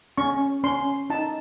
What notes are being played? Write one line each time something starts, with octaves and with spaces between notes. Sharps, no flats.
C#4 C#6
C#4 C6
D#4 A5